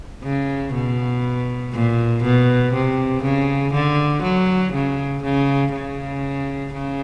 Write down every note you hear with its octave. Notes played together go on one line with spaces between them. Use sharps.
C#3
B2
A#2
B2
C3
C#3
D3
F#3
C#3
C#3
C#3
C#3